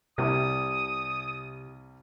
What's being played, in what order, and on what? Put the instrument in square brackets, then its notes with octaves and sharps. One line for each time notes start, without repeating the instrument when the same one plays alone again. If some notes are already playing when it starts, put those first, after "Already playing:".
[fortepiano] C2 G3 E4 [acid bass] C3 [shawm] D#6